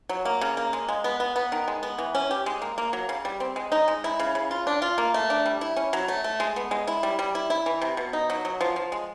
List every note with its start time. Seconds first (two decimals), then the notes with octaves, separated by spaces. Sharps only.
0.09 F#3
0.25 A#3
0.41 C#3
0.57 A#3
0.73 G#3
0.88 G#3
1.04 B3
1.20 B3
1.36 B3
1.52 D#3
1.68 G#3
1.83 B3
1.98 E3
2.15 C#4
2.31 G4
2.46 G#3
2.62 A#3
2.78 A#3
2.93 F#3
3.09 C#3
3.25 G3
3.40 C4
3.56 G#3
3.72 D#4
3.88 G#3
4.04 E4
4.19 C#3
4.35 C#3
4.51 F4
4.67 D4
4.82 F4
4.98 A#3
5.14 A3
5.30 D4
5.46 G3
5.61 E4
5.77 C#4
5.93 F#3
6.08 A3
6.24 A3
6.40 G#3
6.56 B3
6.71 G#3
6.87 E4
7.03 G3
7.19 G3
7.35 E4
7.50 E4
7.66 E3
7.81 C3
7.97 B2
8.13 D#4
8.30 F#3
8.45 F#3
8.61 F3
8.76 F3
8.92 G#3